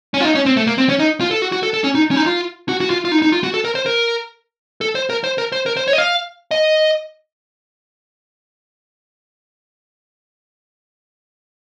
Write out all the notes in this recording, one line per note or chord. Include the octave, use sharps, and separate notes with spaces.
C#4
F4
D#4
C#4
C4
A3
A#3
C4
C#4
D#4
F4
A4
F#4
F#4
A4
A4
C#4
D#4
C#4
D#4
F4
F#4
F#4
F4
F4
D#4
D#4
F4
F#4
A4
A#4
C5
A#4
A4
C5
A#4
C5
A#4
C5
A#4
C5
C#5
D#5
F5
D#5